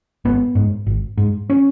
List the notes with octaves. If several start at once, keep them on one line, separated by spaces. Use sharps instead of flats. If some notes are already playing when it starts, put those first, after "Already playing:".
G#1 B3
G#2
G#1
G#2
C#4